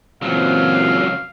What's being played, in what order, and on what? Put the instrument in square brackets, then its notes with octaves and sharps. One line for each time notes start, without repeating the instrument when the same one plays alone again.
[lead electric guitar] C#2 F#3 [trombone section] A#2 E3 C4 [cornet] F5